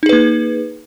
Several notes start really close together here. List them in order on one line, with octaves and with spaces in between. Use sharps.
D#4 G#4 B4 A#3